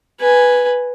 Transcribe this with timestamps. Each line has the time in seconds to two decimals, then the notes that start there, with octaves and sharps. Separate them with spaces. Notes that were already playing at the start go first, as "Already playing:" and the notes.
0.20 B4 G#5